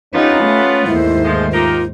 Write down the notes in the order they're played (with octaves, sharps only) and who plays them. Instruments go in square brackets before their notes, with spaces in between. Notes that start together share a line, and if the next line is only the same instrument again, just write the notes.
[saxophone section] B3 F4 [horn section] C#4 [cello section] D#4 G4
[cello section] A3
[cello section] D#2 G#2 C5 [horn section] D#3 A3 [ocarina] E4
[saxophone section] F3 G#3
[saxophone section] D#4 G4 A#4 [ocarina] F4